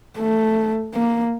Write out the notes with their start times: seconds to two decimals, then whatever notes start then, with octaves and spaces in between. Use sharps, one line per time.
0.18 A3
0.95 A#3